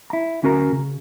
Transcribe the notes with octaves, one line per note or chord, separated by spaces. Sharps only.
E4 A#5
D2 C#4 F#4 A#4 A#5
C#3